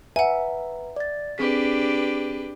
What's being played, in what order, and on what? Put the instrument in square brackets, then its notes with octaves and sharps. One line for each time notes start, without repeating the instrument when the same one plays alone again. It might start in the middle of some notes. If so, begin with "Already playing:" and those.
[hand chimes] B4 A#5 [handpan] E5 [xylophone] F#5 G#5
[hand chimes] D5 A6
[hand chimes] C4 G#4 B6 [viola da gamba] D4 G4 B4